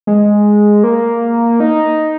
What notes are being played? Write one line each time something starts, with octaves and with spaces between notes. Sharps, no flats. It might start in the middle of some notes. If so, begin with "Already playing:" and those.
G#3
A#3
D#4